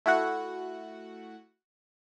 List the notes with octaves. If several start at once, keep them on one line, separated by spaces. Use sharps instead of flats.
A3 E4 F#4 F#5